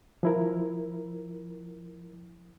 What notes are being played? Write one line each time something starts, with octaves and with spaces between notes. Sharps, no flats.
F3 E4 A#4